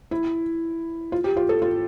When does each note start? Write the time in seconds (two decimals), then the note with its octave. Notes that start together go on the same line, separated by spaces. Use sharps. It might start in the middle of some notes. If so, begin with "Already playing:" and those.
0.11 E4
1.12 F4
1.24 G4
1.37 F4
1.49 A4
1.62 F4